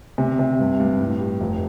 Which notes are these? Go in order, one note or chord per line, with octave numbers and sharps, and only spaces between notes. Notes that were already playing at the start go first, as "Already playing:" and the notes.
C3
C3
G2
G2
A2
G4
F1